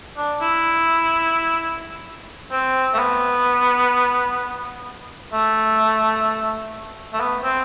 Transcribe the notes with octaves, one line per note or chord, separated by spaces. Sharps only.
D4
E4
C4
A3
B3
A3
A3
B3
C4